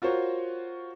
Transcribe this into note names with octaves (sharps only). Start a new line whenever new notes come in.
F4 F#4 A#4 C5 C#5